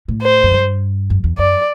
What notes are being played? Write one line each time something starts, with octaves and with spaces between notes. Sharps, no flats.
A2
C5
F#2
G2
F#2
E2
F#2 D5